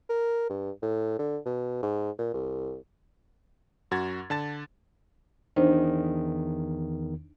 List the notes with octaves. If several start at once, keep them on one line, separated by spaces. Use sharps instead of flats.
A#4
G2
A2
D3
B2
G#2
A#2
C2
F#2 F#4 G#6 A6
D3 A5 A6
E2 D#3 D4 D#4 C5